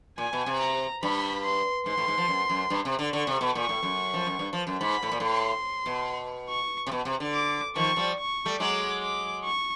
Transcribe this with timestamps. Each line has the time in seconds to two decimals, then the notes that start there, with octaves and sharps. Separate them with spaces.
0.18 A#2 G#5
0.33 B2
0.46 C3
0.60 A#5
1.03 G2 B5
1.44 C6
1.86 G#2 C6
1.97 A2
2.08 G#2
2.17 F3
2.28 F#2
2.49 F#2
2.70 G2
2.85 C3
2.99 D3
3.12 D3 C#6
3.27 C3
3.41 B2
3.55 A#2 C#6
3.69 A2
3.83 F#2
4.14 F3
4.27 F#2
4.39 G2
4.53 F3
4.67 F#2
4.81 G#2 B5
5.02 A2
5.12 A#2
5.20 A2 C6
5.86 B2
6.49 C#6
6.87 C3
6.91 B2
7.05 C3
7.20 D3
7.34 D6
7.76 D#3 F3 C#6
7.96 F3 G3
8.18 C#6
8.46 G3 A3
8.60 F#3 G#3 D6
9.02 D6
9.44 C#6